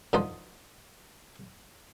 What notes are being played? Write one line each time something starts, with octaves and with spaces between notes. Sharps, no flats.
D3 F3 D#4 C5